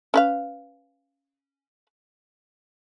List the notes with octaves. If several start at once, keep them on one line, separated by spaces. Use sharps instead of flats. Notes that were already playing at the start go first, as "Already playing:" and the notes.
C#4 B4 F5